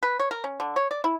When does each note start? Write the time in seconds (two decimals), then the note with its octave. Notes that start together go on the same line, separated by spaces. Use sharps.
0.03 B4
0.19 C#5
0.31 A#4
0.44 C#4
0.60 D3
0.76 C#5
0.91 D5
1.04 E4